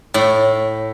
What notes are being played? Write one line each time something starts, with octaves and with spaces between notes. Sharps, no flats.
A2